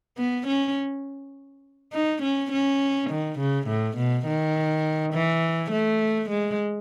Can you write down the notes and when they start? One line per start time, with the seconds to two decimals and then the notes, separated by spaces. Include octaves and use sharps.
0.18 B3
0.47 C#4
1.93 D#4
2.22 C#4
2.52 C#4
3.10 D#3
3.40 C#3
3.68 A2
3.97 B2
4.27 D#3
5.14 E3
5.72 A3
6.30 G#3